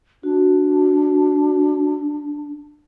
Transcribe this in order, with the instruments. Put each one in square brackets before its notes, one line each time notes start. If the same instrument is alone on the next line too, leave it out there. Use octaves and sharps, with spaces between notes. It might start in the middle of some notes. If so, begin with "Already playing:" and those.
[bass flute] D4 [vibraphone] F#4